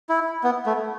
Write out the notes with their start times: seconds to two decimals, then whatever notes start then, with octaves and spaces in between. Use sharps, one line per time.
0.09 E4
0.44 B3
0.66 A3